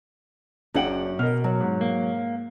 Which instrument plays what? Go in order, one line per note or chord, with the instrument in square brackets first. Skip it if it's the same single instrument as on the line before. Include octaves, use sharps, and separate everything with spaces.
[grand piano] F#1 D4 F#7 [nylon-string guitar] F#2 F#5 G5
[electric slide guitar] B2 [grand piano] A#4 D#5 F6
[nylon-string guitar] F#3
[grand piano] G#2
[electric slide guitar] A#3